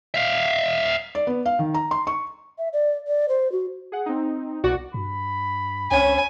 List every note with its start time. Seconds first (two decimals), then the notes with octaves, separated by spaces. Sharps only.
0.14 E5 F5
1.15 D5
1.27 B3
1.46 F5
1.59 D#3
1.74 A#5
1.91 C6
2.07 C#6
2.58 E5
2.73 D5
3.07 D5
3.29 C5
3.52 F#4
3.92 G#4 F#5
4.06 C4 D#4
4.64 C2 B2 F#4 D5 F#5
4.94 G2 B5
5.91 C#2 C4 C#4 E5 G#5